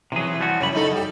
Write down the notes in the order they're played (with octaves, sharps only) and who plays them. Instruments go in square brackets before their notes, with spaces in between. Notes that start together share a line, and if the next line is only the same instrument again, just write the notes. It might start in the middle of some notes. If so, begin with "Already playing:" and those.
[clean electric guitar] C3 G#4 [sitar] E3 F#3
[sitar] E3
[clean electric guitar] F3 G3 F#4
[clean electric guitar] F#2 C#3 B5 [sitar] G3 A#3 C#4
[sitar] A#2 D#4 A4
G3 G4